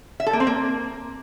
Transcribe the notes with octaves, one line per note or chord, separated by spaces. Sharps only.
E5
A4
A#3
C4
A#3